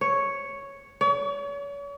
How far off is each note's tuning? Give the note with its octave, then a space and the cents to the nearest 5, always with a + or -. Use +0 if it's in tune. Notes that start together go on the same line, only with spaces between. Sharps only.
C#5 +0
C#5 +40